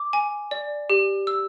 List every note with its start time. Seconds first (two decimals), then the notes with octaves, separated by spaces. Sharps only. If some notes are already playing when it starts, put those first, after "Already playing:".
Already playing: D6
0.13 G#5
0.51 D5
0.90 G4
1.27 E6